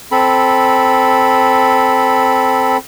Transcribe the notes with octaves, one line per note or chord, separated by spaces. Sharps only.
C4 A4 B5